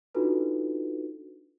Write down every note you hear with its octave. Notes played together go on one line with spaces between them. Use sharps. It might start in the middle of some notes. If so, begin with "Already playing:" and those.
D4 D#4 F4 F#4 A4 B4